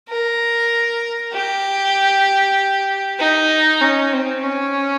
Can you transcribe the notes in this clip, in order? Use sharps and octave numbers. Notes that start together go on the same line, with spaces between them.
A#4
G4
D#4
C#4
C4
C#4